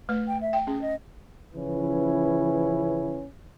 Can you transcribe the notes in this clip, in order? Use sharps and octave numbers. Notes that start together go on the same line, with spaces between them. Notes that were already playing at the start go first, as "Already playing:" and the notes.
A3 B4
G5
E5
G5
C#4 G#4
D#5
C#3 E3 F3 C#4 E4 B4